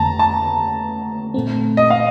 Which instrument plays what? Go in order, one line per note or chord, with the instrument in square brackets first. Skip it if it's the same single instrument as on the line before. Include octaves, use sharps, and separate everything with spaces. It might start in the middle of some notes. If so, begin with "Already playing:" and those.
Already playing: [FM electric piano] F2 D3 A3 [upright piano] A5 A#5
[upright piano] A5
[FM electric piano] A#2 A3 C4
[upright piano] D#5
F5